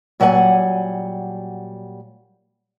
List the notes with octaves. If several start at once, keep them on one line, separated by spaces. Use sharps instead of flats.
A#2 F#3 G3 F#5 G#5